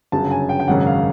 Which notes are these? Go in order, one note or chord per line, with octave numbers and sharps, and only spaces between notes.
G1 F#2 C#3 F#3 A5
G#5
G5
G5
G#1 F#2 C#3 F#5
F5